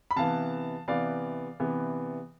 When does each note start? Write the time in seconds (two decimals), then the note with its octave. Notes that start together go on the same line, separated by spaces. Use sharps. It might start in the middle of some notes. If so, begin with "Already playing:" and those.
0.11 B5
0.16 C3 E3 B3 F5 A5
0.88 C3 E3 B3 D5 F5
1.60 C3 E3 B3